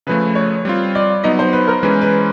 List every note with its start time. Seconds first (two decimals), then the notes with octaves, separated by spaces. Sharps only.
0.07 C#3 F3 A3 B4
0.35 C#5
0.65 G3 C4 F4
0.95 D5
1.24 F#3 B3 D#4 D#5
1.39 C5
1.53 B4
1.68 A#4
1.83 E3 G#3 C#4 B4
2.02 B4